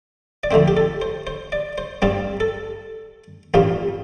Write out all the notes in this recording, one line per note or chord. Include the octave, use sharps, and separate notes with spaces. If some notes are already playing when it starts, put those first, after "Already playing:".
D5
F2 D3 A3 C4 C5
G4
A4
C5
C5
D5
C5
G2 G3 C4 D5
A4
A1 G2 G3 C4 F4